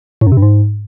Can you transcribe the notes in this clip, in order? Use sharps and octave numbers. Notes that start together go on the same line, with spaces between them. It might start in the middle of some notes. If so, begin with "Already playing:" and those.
A2
F#2
C3
G2
G#2